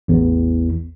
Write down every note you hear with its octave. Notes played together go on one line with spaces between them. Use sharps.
A1 E2